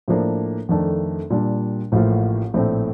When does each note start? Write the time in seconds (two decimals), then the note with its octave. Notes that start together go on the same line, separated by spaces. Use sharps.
0.08 A2 F3 A#3 D4 A4
0.69 F2 D#3 A3 D4
1.30 A#2 G3 D4
1.92 A1 A2 F3 A#3 F4
2.54 A#1 A2 A3 C4